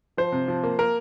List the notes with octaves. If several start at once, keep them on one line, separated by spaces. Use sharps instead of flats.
F3 C5
C3
F3
A#3
A#3 A#4